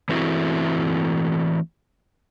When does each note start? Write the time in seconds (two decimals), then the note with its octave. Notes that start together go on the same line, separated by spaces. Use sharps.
0.09 E3 A3 C4 E4 F#4 E5